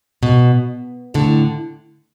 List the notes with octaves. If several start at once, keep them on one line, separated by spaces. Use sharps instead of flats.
B2
A2 D3